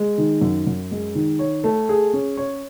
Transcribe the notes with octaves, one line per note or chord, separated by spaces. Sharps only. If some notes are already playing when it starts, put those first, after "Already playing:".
Already playing: G#3
D#3
F#2
F#2
G#3
D#3
C#5
A3
G#4
C#4
C#5